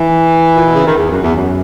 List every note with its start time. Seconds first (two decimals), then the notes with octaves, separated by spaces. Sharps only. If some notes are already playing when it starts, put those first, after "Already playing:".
Already playing: E3
0.54 A#2
0.65 B2
0.74 C#3
0.85 D#3
0.97 E2
1.11 F#2
1.23 E2
1.35 F#2